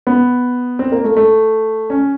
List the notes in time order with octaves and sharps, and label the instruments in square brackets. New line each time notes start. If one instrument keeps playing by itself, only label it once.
[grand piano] B3
C4
A#3
A3
A3
C#4